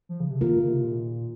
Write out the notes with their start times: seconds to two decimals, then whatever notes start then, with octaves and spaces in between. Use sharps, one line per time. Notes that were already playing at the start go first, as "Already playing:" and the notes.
0.09 F3
0.20 C#3
0.30 C3
0.41 D#3 A#3 F4 A#4
0.56 C#3
0.69 C3
0.82 A#2